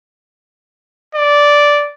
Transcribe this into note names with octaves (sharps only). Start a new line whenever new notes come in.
D5